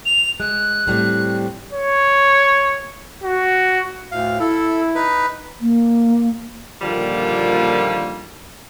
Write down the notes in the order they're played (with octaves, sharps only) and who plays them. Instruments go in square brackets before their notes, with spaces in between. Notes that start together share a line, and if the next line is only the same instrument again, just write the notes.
[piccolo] F7
[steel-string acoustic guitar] G#3 [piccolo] F#6
[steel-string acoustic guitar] A2 G3 C4
[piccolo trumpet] C#5
F#4
[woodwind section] D2 A2 [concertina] F5
[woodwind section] E4 [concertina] A4
[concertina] D#4 B4
[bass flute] A#3
[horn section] A#2 D3 D#3 F3 G3 A#3